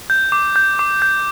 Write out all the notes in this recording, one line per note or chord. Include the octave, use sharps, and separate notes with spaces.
G6
D6
G6
D6
G6